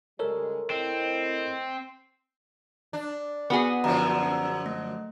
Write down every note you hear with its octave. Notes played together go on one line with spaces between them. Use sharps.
C#3 G3 G#3 A4 A#4 C#5
A2 C4 E4 D#5
D4
B3 F#4 G#4
F#2 D3 F3 A#5
A3